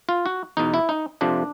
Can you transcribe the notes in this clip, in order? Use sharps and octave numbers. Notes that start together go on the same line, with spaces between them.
F4
F#4
E2 B2 D#4
E4
D#4
F2 C3 F3 D4